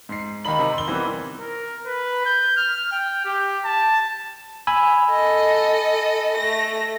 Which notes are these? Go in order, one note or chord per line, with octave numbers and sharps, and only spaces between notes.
G#2 C7
D#2 D#4 A#5 B5 F#7
C3 D#3 D#4
C6 G7
D#3 E3 G3 B3 C4
A#4
B4
G6
F6
G5
G4
A5
G#5 B5 E6
A4 D#5
A3 A#6